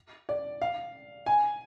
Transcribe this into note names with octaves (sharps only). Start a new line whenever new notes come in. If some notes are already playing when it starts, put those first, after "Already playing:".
D5
F5
G#5